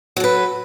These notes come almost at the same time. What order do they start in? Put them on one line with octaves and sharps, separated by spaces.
F#3 A4 B4